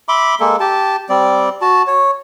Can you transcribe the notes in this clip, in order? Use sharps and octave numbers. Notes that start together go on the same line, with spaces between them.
E5 B5 C6 D6
G#3 A#3 A4
G4 A5
G3 C4 D5
F#4 A5
C#5